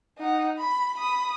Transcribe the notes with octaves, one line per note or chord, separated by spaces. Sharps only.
D#4 F#5
B5
B5 D#6